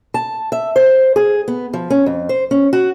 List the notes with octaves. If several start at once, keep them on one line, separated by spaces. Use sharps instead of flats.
A5
E5
C5
G#4
B3
F3
C#4
F2
C5
C#4
F#4